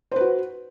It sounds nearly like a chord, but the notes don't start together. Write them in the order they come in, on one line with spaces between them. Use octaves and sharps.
C5 B4 F#4